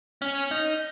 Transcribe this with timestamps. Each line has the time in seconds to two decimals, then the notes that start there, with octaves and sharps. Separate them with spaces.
0.22 C#4
0.51 D#4